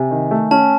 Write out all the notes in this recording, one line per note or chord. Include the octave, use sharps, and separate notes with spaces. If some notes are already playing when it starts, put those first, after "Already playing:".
Already playing: C3 G#5
D#3
A3
C#4 A5